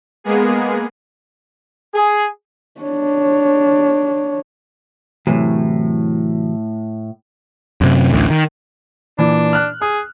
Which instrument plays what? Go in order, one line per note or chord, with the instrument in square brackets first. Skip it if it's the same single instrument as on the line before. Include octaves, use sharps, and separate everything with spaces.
[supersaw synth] G#3 A#3 B3 G#4
[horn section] G#4
[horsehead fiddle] D4 C#5
[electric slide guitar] A2 [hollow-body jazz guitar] C3 E3 F#3
[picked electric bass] F#2 C3
A1 D2
D#3
[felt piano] A#2 E3 [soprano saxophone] D4
[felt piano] F6 F#6
[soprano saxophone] G#4 [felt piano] D#6